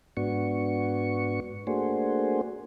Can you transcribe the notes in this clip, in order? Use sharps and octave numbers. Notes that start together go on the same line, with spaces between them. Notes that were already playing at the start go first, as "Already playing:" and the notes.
G#2 B3 D4 F#4 C#6
A3 A#3 D4 F#4 G#4 C5